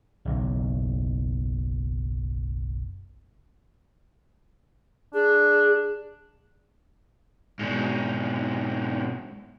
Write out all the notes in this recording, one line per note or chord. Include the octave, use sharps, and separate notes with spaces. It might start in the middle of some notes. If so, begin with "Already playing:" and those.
F#1 B1 B2
D4 G#4
G#2 B2